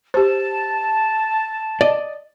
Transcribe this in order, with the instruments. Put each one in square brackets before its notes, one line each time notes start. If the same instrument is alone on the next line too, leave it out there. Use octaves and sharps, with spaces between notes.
[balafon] G4 C5 [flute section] A5
[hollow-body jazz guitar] D5 D#5